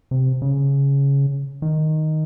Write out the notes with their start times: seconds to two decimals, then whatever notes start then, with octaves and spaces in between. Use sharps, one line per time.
0.11 C3
0.42 C#3
1.62 D#3